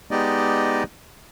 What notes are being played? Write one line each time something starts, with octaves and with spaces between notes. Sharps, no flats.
G#3 B3 D#4 G4 D5 D#5